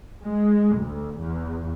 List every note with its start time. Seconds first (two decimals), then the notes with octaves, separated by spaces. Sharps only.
0.25 G#3
0.77 D2
1.20 E2